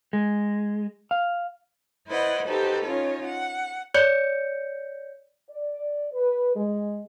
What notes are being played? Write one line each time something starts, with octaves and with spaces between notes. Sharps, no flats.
G#3
F5
E4 B4 C5 D5 D#5 F#5
D#4 F#4 G4 A4 B4 C5
C#4 D#4 F4 C#5
F#5
C#5 D5 G6 C#7
D5
B4
G#3